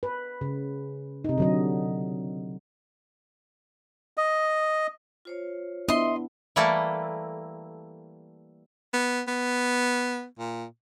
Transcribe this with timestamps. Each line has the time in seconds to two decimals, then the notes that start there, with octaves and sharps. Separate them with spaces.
0.03 B4
0.41 C#3
1.24 C3 D#4
1.38 D3 F#3 D#5
4.17 D#5
5.25 F4 C5 C#5
5.89 B3 D4 E4 D#5 E5 C6
6.56 E3 G3 A3 A#3 E4 A4
8.93 B3
9.28 B3
10.39 A#2